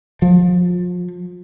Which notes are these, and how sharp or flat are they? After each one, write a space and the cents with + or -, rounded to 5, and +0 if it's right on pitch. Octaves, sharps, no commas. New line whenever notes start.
F3 +35